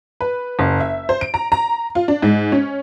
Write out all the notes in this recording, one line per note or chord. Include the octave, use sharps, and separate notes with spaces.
B4
F#1
E5
C5
D7
A#5
A#5
F4
D4
G#2
C#4